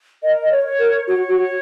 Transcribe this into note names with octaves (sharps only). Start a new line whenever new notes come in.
A#4 D#5
D#5
C#5
C#5
A#4
F#4 C#5
F#4